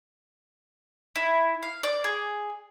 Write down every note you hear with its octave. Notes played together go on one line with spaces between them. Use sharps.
E4
F5
D5
G#4